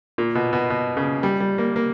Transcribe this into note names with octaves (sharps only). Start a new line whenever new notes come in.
A#2
B2
B2
B2
C#3
G3
G3
A#3
A#3